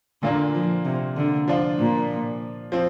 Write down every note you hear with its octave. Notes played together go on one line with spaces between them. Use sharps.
A#2 D3 A#3 D4
F3
C3
D3
F3 D4 F4
A#2
F3 C4